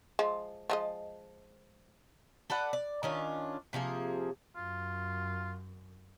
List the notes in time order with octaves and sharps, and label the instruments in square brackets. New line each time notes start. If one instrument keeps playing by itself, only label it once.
[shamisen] F3 G#3
F3 G#3 D#5
[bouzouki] A4 B4 D5 F#5
D5
D#3 C#4 D4 F4
C3 F3 A#3 G#4
[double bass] F#2 [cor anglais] F4